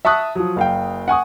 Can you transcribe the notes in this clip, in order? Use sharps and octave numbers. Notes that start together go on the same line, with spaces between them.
E5 A5 C#6 D#6 F#6
F3 F#3
F#1 F5 G5
F#5 G#5 C#6 D#6